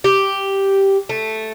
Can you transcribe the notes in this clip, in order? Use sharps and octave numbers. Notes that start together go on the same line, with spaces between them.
G4
A3